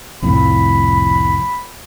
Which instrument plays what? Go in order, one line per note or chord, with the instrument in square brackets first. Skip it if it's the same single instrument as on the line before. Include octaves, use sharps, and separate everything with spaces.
[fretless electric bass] C2 F2 A2 [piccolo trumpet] B5